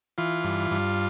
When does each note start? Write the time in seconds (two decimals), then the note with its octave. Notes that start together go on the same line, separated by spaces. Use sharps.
0.18 E3 F4
0.44 G2
0.71 G2